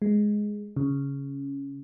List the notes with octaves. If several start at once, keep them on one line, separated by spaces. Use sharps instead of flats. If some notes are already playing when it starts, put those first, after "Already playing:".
G#3
C#3